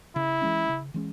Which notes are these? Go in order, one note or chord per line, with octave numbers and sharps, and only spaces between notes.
C#3 E4
E3 G#3 C#4
C#3
E3 G#3 C#4